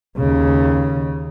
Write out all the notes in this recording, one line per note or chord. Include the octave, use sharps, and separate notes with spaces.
D#2 C#3